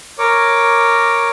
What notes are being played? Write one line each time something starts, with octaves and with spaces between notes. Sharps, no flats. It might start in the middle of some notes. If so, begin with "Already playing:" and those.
A#4 C#5 D6